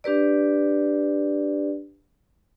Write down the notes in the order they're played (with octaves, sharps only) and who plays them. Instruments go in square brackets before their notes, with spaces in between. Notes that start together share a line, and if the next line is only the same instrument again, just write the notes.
[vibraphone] D4 G4 B4 D5